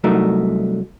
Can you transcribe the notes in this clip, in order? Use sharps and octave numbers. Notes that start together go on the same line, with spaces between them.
C2 F#3 A3 D#4 A#4